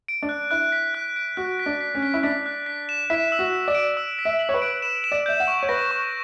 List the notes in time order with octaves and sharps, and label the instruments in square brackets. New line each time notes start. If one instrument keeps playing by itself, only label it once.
[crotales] D7
[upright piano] D4
[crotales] F#6
[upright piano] E4 [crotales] F#6
[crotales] B6
F#6
D7
[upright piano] F#4 [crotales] F#6
[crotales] B6
[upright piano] D4
[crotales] B6
[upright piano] C#4
[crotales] B6
[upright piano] E4
[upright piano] D4 [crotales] B6
[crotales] F#6
B6
E7
[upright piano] E4 [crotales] B6
[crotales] E6
[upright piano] F#4
[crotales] B6
[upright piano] D5
[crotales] D7
E6
B6
[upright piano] E5
[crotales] F#7
[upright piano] C#5
B4
[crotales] D7
E7
E7
[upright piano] D5
[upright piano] E5 [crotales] G6
[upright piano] F#5
[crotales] C#6
[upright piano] C#5
[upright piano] B4 [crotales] A#6
[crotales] C#6